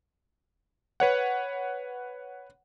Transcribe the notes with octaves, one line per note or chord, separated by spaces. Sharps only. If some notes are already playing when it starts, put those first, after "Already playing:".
B4 C#5 F#5